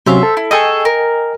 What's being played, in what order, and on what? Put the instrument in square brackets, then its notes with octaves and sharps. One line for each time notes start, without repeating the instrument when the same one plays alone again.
[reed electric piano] C3 F#3 C#4 [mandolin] C5 E5 F5
[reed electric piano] A4
[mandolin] E4
[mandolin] G#4 A4 C#6 [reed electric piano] D#5 G5 G#5
[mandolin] A#4